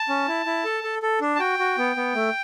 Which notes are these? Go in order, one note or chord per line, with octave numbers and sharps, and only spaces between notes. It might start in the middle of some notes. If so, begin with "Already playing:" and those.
Already playing: A5
C#4
E4
E4
A4
A4
A4
D4
A5
F#4 G5
F#4
B3
B3
A3